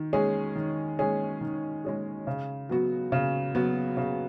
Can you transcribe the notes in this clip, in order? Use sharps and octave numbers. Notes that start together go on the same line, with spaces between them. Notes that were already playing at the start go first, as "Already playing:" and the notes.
Already playing: D#3
G#3 C#4 G#4
D#3
G#3 C#4 G#4
D#3
G#3 C#4 G#4
C#3
F#3 B3 F#4
C#3
F#3 B3 F#4
C#3